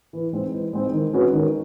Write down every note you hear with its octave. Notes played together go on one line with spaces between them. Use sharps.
E3
G#3 C4 D#4
E3
G#3 C4 D#4
D#3
G#3 C#4 F#4 B4
D#3